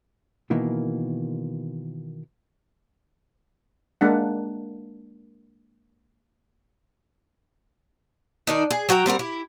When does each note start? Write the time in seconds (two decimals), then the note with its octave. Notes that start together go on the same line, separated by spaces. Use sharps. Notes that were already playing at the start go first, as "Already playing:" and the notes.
0.50 B2 D#3 E3 A#3
4.01 G#3 A#3 D4 F#5
8.47 D#3 D4 D#4
8.71 G#4
8.89 F#3 F#4 G5 A#5
9.06 G3 C4 F#4 A#4
9.19 E4 G4